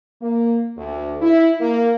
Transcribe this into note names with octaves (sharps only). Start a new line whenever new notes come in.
A#3
D2
E4
A#3